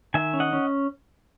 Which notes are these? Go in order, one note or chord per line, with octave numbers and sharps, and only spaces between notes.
D#3 E5 G#5
C#4
D#5 F#5
C#4